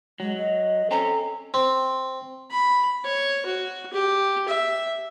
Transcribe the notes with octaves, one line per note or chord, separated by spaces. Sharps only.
F#3 G#3
D#5
C4 C#4 A4 A#5
C4
B5
C#5
F#4
G4
E5